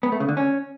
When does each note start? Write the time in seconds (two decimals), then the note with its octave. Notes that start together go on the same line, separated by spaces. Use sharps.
0.03 B3
0.12 A3
0.20 C#3
0.29 D3
0.37 C#4